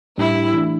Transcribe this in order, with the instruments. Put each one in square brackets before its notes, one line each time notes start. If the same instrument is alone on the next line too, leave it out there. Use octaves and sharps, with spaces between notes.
[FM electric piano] A2 G3 D4 G4 [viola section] E4
[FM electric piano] E3 A3 D4